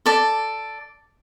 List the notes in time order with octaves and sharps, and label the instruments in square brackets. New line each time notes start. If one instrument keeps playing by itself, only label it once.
[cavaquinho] A4 D5